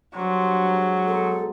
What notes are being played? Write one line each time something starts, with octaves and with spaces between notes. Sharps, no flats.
G2 F#3 D4 C5
G#3
B2 D#4 A4 C6